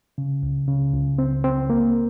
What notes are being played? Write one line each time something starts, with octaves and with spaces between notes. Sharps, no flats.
C#3
C#2
C#3
C#2
C4
C4
A#3